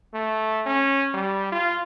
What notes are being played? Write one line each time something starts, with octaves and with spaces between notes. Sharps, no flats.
A3
C#4
G3
F4